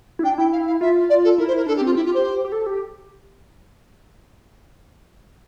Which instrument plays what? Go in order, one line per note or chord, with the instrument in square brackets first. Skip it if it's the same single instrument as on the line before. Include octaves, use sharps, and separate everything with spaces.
[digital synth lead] E4
[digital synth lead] D4 [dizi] G5
[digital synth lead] E4 [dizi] G5
[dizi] F5
F5
[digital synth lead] F4 [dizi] E5
[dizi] D5
A4
[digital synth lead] E4 [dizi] A#4
[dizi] C5
A#4
[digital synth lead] D4 [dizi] A4
[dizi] G4
[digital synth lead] C4 [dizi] F4
[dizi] E4 [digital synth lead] G4
[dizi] F4
C5
[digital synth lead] G4
A4
G4